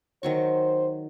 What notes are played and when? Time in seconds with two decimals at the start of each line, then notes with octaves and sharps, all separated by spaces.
0.23 D#3 F#3 C5 C#6